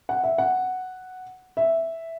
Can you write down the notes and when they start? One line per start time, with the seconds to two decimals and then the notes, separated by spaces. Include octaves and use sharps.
0.09 F#5
0.24 E5
0.38 F#5
1.57 E5